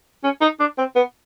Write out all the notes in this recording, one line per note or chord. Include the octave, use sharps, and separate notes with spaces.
C#4
D#4
D4
C4
B3